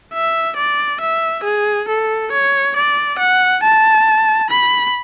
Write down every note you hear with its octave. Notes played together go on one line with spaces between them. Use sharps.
E5
D5
E5
G#4
A4
C#5
D5
F#5
A5
B5